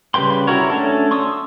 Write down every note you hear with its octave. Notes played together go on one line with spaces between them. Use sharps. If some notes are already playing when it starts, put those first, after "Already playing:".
C#3 G3 B4 G5 C6
E4 F#4 A#4 C#5
A3 C#4 D4 A4
C6 C#6 D#6 E6